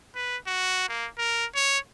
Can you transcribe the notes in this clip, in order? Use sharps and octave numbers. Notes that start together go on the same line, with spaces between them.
B4
F#4
A#3
A#4
C#5